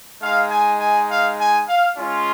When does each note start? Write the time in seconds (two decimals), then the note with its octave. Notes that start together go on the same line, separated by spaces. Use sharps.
0.21 G#3 D#4 F5
0.50 G#5
0.79 G#5
1.09 F5
1.38 G#5
1.67 F5
1.97 G#3 C#4 F4